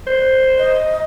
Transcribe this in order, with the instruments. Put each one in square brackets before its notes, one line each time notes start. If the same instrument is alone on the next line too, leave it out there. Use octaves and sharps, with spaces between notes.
[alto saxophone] C5
[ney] D#5